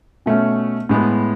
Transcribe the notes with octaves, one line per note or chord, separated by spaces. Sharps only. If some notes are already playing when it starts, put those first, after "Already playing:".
B2 A3 C#4
A2 G#3 B3